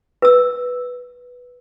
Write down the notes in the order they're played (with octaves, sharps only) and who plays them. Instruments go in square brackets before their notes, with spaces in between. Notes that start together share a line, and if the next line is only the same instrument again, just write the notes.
[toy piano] B4 E6